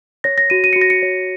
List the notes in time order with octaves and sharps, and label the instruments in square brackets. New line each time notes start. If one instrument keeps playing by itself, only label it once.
[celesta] C#5 A#6
A#6
F#4 D#7
D#7
F#4 C#7
A#6
C#7
C#5